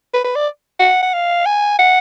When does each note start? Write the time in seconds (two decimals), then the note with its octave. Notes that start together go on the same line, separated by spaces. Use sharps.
0.14 B4
0.25 B4
0.36 D5
0.80 F#5
1.03 F#5
1.14 F5
1.46 G#5
1.79 F#5